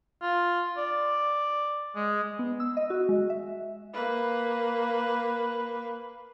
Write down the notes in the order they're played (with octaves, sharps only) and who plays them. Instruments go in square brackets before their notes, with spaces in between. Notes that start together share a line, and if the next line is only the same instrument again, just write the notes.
[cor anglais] F4
D5
G#3
[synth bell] B3
E6
D#5
F#4
G#3
E5
[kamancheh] A#3 B4